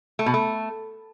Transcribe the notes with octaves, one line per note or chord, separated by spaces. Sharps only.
A3
B2
A3